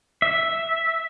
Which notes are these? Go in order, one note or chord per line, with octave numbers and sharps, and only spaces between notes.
E5